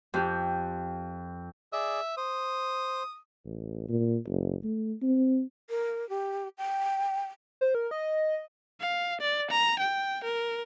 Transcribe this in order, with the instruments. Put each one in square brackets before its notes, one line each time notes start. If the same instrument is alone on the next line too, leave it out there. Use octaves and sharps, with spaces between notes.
[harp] F2 G4
[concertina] G#4 D5 [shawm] E5
[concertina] C5 [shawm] D#6
[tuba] A1
A#2
F#1
A3
C4
[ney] A#4
G4
G5
[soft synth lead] C5
A#4
D#5
[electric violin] F5
D5
A#5
G5
A#4